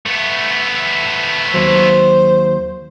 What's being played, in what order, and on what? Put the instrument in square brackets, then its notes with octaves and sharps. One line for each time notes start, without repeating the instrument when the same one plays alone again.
[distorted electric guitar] A3 B3
[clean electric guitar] D#2 F#3 [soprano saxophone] C5